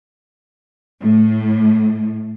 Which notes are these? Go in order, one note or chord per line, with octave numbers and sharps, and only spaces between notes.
A2